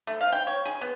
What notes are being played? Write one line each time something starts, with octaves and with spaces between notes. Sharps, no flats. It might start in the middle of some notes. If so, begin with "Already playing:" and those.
A3
F5
G5
C#5
G#4
B3